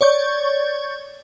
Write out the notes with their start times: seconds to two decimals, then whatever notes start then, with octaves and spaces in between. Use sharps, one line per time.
0.01 C#5 D5 C#6 G6